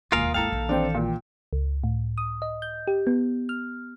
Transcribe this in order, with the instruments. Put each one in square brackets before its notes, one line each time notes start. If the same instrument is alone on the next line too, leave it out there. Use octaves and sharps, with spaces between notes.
[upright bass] E1 [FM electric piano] D#2 G#5 D#6 [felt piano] A#3 [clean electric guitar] F4 A#4 F5
[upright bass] G#1 E4 [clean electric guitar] A4 F5 [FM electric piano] G5 A#5
[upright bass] A#1 D#3
[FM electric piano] E3 G5 [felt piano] C4 D4
[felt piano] A#2
[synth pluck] C#2
A2
D#6
D#5
G6
G4
B3
F6